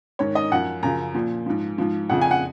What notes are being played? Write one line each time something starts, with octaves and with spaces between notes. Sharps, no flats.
G#2 D#3 C#5
D#5
F#2 F3 F#5
F#2 C#3 F3 A#5
A#2 F3
G#2 F3
G#2 F3
F2 C#3 F3 F#5
G#5
F#5